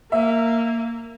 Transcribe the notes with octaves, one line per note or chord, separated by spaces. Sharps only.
A#3 E5